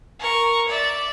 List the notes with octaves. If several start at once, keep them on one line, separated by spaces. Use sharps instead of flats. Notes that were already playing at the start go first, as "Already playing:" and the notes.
A#4 C#6
D5 E5